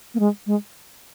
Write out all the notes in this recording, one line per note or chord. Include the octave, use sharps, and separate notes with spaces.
A#3
G#3
G#3